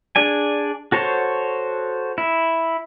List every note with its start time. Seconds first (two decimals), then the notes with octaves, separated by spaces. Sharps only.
0.16 D4 G#4 D5 G#5
0.92 F#4 A4 C5 C#5
2.18 E4